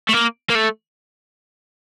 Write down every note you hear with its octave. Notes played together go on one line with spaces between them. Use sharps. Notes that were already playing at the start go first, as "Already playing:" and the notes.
A3
A#3
A#3
A3